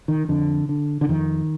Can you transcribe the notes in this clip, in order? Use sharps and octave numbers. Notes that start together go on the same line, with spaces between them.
D#3
F2 D3
D3
D3
F2 D#3